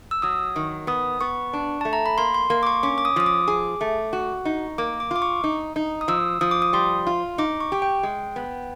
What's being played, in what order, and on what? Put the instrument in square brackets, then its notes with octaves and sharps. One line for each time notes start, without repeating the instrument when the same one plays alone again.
[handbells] E6
[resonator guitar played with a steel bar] F#3 [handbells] D#6
[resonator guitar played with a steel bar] D#3
[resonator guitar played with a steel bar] B3 [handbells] D#6
[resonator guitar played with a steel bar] B3 [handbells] C#6
[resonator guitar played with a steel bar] D4
[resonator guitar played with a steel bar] A3 [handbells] A5
[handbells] A#5
B5
[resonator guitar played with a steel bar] A#3 [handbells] C6
[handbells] C6
[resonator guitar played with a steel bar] A#3 [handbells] C6
[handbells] D6
C#6
[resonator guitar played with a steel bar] C#4 [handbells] D6
[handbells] D6
D#6
[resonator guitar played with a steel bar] F3 [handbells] D#6
[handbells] D6
[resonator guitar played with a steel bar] G#4
A3
F#4
D#4
[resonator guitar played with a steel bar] A#3 [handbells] D6
[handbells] D6
[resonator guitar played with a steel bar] F4
[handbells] D6
C#6
[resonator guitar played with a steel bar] D#4
D#4
[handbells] D#6
[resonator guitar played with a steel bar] F3 [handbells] E6
[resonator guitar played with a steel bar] F3 [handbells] D#6
[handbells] D6
D#6
[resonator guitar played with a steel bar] G3 [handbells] C6
[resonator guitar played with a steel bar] F4
[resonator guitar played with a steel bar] D#4 [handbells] D6
[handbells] C#6
[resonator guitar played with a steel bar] G4
[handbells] G5
[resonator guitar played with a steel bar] G#3
B3